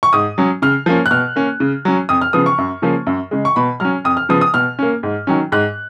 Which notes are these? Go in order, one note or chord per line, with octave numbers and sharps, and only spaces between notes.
C#6
G#2 D#6
F#3 C#4
C#3 F6
F3 A#3 C#4
F#6
B2 F6
A#3 C#4
C#3
F#3 C#4
F2 D#6
F6
C#3 F3 B3 D#6
C#6
F#2
C#3 F3 A#3 C#4
F#2
C#3 G#3
C#6
B2 B5
F#3 C#4 F6
F2 D#6
F6
C#3 F3 B3 D#6
D#6
B2 F6
A#3 C#4
G#2
D#3 F#3 C#4
G#2 F#6